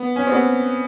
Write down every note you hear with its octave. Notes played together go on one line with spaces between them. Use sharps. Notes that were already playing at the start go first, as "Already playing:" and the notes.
Already playing: B3
C#4
C4
B3